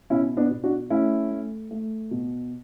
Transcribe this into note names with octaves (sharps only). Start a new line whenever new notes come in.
B2 C#4 E4
B3 D4
B2
D4 F#4
A3 C#4 E4
A3
A3
B2